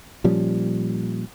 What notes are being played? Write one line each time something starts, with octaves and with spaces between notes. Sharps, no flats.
A#2 F3 G3 C#4